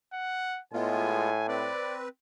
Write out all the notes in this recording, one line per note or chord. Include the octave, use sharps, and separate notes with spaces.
F#5
A2 G#3 B3 F4 G#5
C4 B4 D5